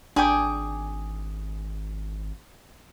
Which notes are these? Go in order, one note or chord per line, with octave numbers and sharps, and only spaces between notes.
G#1 D4 G#4 G5 G#5 D6